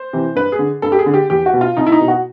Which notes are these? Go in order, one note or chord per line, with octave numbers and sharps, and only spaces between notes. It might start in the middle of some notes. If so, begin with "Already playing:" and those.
Already playing: C5
C3 E3
G2 B4
G#4
D3
G2 A4
G4
G#4
D3
G4
E2 G4
F#4
B2
F4
C2 D#4
E4
D#4
B2
F#4